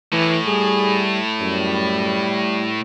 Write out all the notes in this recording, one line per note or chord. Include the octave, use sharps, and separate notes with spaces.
A2 E3
G3 G#4
F#2 G3